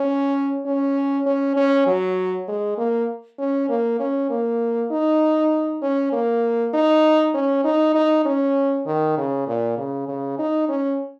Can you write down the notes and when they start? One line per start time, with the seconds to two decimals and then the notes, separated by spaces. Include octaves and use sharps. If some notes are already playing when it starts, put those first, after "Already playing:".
Already playing: C#4
0.66 C#4
1.26 C#4
1.56 C#4
1.87 F#3
2.48 G#3
2.78 A#3
3.39 C#4
3.69 A#3
4.00 C#4
4.30 A#3
4.91 D#4
5.82 C#4
6.13 A#3
6.74 D#4
7.34 C#4
7.64 D#4
7.95 D#4
8.25 C#4
8.86 D#3
9.17 C#3
9.47 A#2
9.77 C#3
10.08 C#3
10.39 D#4
10.69 C#4